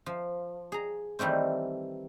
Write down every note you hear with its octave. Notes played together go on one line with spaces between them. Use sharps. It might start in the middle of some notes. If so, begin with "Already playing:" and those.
F3
G#4 A#5
D#3 E3 G3 A3 C4